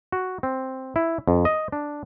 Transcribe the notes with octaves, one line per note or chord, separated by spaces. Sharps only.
F#4
C4
E4
F2
D#5
D4